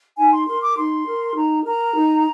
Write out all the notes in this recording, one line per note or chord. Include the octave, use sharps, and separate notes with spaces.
D#4 G#5
C6
A#4 C6
D6
D#4 C6
A#4
D#4 A#5
A#4 A#5
D#4